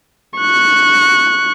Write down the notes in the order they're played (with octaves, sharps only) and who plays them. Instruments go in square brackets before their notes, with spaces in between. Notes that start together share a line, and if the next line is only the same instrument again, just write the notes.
[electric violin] C#6 F#6